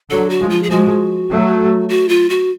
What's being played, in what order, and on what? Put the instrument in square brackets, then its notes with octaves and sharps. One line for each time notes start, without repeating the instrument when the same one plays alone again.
[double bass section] D3 F#3 [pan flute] A4
[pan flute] F#4
[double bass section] F3 G#3
[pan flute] F4
G#4
[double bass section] F3 G#3 [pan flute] F#4
[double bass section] F#3 A3
[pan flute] F#4
F4
F#4